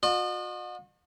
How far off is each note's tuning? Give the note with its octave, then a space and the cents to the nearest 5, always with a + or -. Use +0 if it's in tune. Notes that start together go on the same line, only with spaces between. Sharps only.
F#4 -45 D#5 -35